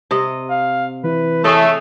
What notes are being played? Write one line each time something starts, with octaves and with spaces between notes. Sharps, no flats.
C3 D#5
F5
E3 E4 B4
A3 G#4 C#5 D#5